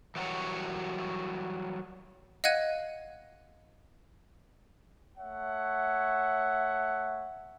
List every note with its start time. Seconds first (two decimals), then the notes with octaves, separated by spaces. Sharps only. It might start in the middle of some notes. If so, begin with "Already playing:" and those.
0.15 E3 F#3 G3 F#4 A#4 C#5
2.44 D#5 F5 F#5 F#6 G#6 D#7
5.18 A3 C#5 E5 F#5